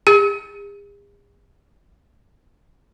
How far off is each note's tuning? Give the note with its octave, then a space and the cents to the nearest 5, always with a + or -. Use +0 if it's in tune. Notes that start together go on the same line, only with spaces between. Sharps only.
G#4 -45